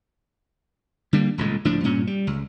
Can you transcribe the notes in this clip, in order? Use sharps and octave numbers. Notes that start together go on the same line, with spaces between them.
D3 G3 A#3
D#1 C#2 A2 G#3
C#2 A2 F3 D4
G2 A#2 C#4
G3
C#2